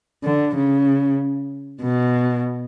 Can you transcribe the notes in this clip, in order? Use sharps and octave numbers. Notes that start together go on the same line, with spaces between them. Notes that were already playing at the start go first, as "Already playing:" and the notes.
D3
C#3
B2